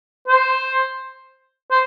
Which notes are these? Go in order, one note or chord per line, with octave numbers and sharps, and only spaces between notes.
C5
C5